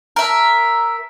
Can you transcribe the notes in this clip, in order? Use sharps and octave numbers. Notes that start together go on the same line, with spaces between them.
A#4 E5